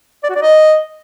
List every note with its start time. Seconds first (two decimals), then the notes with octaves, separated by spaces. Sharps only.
0.24 D5
0.30 F#4
0.36 D5
0.42 D#5